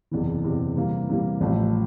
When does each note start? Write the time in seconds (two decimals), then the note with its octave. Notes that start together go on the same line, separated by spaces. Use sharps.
0.11 F#1 E2 C3 E3
0.43 F#1 E2 C3 E3
0.76 C3 E3 G3 A#3
1.09 C3 E3 G3 A#3
1.41 A1 A2 F3 A3